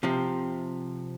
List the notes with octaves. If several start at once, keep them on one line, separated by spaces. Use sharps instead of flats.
C3 F3 C4